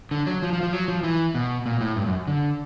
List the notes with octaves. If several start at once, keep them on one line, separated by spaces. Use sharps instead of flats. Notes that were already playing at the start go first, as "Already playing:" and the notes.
D3
F#3
F3
F3
F3
F#3
F3
E3
B2
A#2
A2
G2
F#2
D3